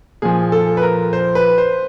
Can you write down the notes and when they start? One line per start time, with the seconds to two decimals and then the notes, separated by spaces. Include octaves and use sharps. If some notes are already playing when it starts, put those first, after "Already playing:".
0.22 A#2 F3 G#4
0.52 A4
0.77 B4
0.82 A#4
1.13 C5
1.35 B4
1.58 C5